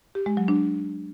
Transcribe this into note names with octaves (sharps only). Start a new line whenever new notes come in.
G4
G#3
F#3
D4